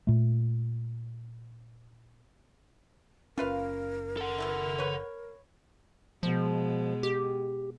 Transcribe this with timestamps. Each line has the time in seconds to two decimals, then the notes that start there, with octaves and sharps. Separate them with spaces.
0.07 A#2 A3
3.38 F#1 C#4 F4 A#4 B4 F5
4.17 A4 F#5
4.38 B2 D#3 E4
4.78 B4 C#5
6.23 B2 F3 G#3
7.03 G4